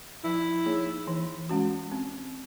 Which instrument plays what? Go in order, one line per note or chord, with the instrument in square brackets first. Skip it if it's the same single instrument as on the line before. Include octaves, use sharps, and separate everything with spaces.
[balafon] F3 [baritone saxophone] E4
[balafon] A#3 D#4 G#4 C#5
E3
G#3 C#4 F#4
C4